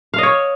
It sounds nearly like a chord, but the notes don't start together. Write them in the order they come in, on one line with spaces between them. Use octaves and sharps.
F5 D#5 C#5